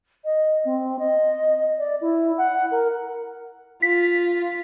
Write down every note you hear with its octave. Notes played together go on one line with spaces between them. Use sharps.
D#5
C4
D#5
D5
E4
F#5
A#4
F4 B6